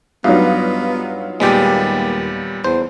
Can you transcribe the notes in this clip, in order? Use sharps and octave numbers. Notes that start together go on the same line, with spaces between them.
G2 F#3 B3 D#4 F4
D#2 A#2 G3 G#3 B3 G4
E2 C5